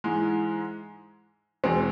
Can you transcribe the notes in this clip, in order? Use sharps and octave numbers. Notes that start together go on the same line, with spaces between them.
G#2 E3 G#3
E2 B2 G#3 C4